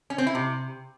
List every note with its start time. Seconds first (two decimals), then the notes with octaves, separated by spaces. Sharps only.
0.10 C#4
0.18 C4
0.27 E4
0.35 C3